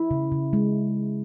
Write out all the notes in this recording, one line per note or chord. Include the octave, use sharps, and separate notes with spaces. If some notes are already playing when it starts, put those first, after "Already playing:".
Already playing: E4
C#3
C#3
G#3